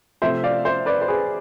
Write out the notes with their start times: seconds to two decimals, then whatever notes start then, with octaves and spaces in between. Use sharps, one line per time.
0.22 C3 F3 A3 C5 E5
0.43 D5 F5
0.65 C5 E5
0.86 B4 D5
1.02 C5
1.08 G#4 B4